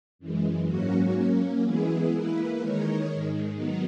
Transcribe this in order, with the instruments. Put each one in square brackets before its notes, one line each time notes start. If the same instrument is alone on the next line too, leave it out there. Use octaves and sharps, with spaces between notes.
[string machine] F#2 E3 G#3
G#2 F#3 A#3 C#4 F#4
F#3 A#3 C#4
E3 G#3 B3 E4 G#4
E3 A#3 E4 B4
D#3 G#3 D#4 A#4 C#5
G#2 D#3 G#3
D#3 F#3 B3 D#4